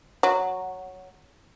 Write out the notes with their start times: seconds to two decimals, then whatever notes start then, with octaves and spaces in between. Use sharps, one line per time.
0.23 F#3